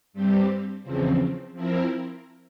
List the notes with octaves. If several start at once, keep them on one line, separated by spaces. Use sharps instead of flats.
G2 G3 C4 G4
E2 C#3 F3 C4
F3 C4 E4 A#4